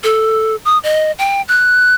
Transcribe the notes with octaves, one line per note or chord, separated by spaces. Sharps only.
A4
D#6
D#5
G5
F#6